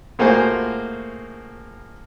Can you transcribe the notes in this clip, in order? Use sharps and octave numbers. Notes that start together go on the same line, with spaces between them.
A2 A#3 F4 F#4 G#4 C5